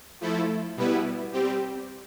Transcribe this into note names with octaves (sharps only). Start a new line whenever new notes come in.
F3 A3 E4 A4
B2 G3 B3 E4 B4
G3 C4 G4